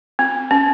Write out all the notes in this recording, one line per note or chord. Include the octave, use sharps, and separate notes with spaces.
C4
C#4